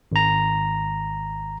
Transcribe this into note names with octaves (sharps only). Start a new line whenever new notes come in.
G#1 A#5